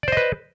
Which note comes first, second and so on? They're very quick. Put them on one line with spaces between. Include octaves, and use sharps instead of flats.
D5 C5 D#5 B4